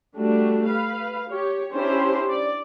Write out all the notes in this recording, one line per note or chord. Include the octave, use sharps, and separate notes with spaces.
G3 A3 D4 F#4
B4 F5
G4 C#5
C#4 D4 E4 G4 C5
D5